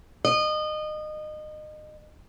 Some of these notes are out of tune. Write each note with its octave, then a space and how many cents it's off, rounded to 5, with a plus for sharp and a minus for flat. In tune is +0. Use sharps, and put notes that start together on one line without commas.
D#5 -25